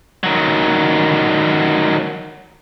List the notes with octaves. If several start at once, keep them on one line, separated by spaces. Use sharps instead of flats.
D#3 F#3